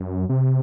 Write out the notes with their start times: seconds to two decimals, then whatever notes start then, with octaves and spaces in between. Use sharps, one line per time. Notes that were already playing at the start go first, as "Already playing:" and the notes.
Already playing: F#2
0.29 C3